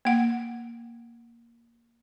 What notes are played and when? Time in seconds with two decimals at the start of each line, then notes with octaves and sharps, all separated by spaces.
0.05 A#3 F#5